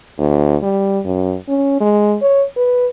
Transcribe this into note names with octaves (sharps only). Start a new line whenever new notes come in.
D2
G3
F#2
C#4
G#3
C#5
B4